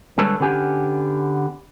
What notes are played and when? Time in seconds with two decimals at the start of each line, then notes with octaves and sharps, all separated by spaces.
0.18 D3 G3 G#3 A4 B4 C#5
0.40 D3 B3 C#4 G4 G#5